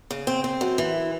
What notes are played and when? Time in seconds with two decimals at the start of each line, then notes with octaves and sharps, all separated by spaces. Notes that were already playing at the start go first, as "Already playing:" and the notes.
0.11 C#3
0.27 C4
0.44 C4
0.61 F#2
0.78 E3